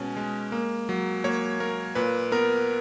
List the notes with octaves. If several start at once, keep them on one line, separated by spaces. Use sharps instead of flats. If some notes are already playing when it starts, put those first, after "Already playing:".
Already playing: B2 G#3 C#4
G#3
A#3
F#3
A#3 C#5
A#3 A#4
A#2 B4
B3 A#4